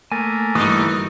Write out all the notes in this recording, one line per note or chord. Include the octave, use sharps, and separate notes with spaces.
A3 A#3 G#5
G1 E3 G3 D#4 F#4 D#6